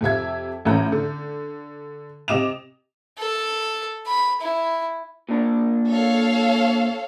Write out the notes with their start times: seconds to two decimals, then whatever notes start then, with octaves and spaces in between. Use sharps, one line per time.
0.01 F2 C3 E5 G#6
0.65 A1 A2 E3 C#4 A#5 G6
0.92 D3
2.28 C3 D#5 D6 E7 F7
3.19 A4
4.07 B5
4.41 E4
5.29 A#2 D4
5.89 A4 C#5 F5